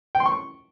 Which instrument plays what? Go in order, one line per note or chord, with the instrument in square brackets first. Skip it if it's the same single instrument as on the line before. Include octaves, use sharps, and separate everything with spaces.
[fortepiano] G5
C6
C#6